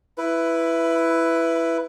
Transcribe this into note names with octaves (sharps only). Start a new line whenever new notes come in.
E4 B4